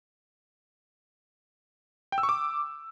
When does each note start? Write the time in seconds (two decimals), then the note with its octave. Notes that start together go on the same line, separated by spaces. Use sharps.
2.12 G5
2.18 E6
2.23 C#6
2.29 D6